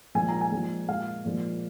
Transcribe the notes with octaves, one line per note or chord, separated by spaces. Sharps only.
A#2 F3 G#3 G#5
A#5
G#5
A#2 F3 G#3
A#2 G#3 F5
A#2 F3 G#3